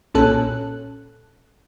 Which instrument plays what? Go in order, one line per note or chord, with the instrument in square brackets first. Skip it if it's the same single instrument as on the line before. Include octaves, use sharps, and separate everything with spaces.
[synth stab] B1 A#2 C#4 A4 F#6